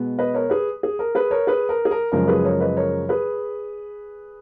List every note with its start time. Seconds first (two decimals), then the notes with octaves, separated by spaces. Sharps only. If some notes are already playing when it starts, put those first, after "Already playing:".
Already playing: B2 G#3 B3
0.19 B4 D#5
0.34 A#4 C#5
0.50 G#4 B4
0.83 G#4
0.99 A#4
1.15 G#4 B4
1.31 A#4 C#5
1.47 G#4 B4
1.69 A#4
1.85 G#4
1.91 A#4
2.12 F#2 C#3 F3 G#3 A#4
2.28 G#4 B4
2.45 A#4 C#5
2.60 B4 D#5
2.76 A#4 C#5
3.09 G#4 B4